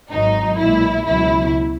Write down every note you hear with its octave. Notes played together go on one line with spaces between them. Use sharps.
G#1 G#2 D#3 F#3 D#4
B1 A#2 G#3 E4
C#2 B2 F#3 E4